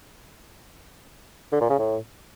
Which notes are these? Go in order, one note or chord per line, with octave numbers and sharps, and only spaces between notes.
D3
A#2
C#3
A2